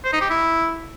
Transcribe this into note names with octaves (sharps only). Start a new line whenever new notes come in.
C5
D#4
G4
E4